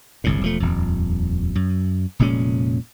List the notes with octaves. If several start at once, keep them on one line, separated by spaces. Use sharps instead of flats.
G1 C2 A2
E1 F3 A3
D#1 F2
F#2
F1 A#2 G#3 C#4